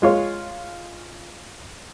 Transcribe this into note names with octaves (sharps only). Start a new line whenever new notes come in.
G#3 F4 C#5